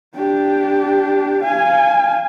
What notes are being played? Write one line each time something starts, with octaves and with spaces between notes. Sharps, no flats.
D4 G4
F5 G#5